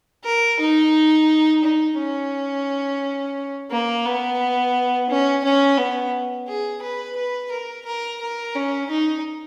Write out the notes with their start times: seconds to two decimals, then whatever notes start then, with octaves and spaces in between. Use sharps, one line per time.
0.24 A#4
0.60 D#4
1.63 D#4
1.98 C#4
3.71 A#3
4.05 B3
5.10 C#4
5.44 C#4
5.78 B3
6.48 G#4
6.82 B4
7.16 B4
7.51 A#4
7.85 A#4
8.21 A#4
8.55 C#4
8.90 D#4